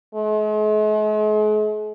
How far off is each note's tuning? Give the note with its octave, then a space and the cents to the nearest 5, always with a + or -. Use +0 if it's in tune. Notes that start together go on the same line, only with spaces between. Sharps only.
G#3 +45